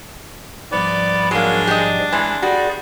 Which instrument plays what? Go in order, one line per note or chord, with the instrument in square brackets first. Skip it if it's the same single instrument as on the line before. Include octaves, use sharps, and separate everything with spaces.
[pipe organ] G#2 F3 G3 [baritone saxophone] B3 [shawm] D5
[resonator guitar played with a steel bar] F#3 A#3 [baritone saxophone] G#3 [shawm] D4
[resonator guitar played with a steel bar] G4 D#5
[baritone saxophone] E3 [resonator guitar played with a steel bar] G#3
[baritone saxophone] G3 [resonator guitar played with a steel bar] F#4 [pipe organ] G#4 D5